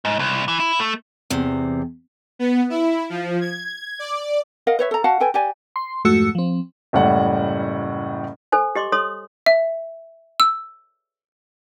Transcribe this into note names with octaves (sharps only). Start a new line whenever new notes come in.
G#2
C2
E3
E4
A3
E2 C3
B3
E4
F3
G#6
D5
A#4 D#5 F5 F#5
B4 C#5 E5
A4 A#5
F#4 F5 F#5 A5
A4 B4 G5 G#5
G4 D5 G#5
C6
F2 G#2 A3 F#4 E6 C#7
F3 C4
F#1 A2 G3 F#5
A4 C5 G#5
G4 D#5 C6 D6
A4 C#5 C6 D#6
E5
E6